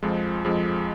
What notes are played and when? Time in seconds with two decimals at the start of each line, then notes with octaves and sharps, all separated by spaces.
0.03 F2 F3 G#3
0.45 F2 F3 G#3